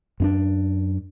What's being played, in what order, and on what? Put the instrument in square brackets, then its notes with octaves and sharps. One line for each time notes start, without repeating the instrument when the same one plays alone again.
[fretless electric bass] F#2 C#4 D4